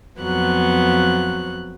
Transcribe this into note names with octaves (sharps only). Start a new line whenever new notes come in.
F2 F#3 B3 F#6